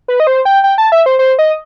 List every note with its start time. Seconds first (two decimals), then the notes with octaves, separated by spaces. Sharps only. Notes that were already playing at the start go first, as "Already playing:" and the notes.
0.08 B4
0.20 D#5
0.27 C5
0.45 G5
0.64 G5
0.78 A5
0.92 E5
1.06 C5
1.19 C5
1.39 D#5